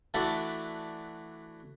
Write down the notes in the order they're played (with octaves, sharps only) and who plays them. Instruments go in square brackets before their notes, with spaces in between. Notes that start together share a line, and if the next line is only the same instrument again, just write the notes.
[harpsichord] E3 A3 D4 F#4 D5 E5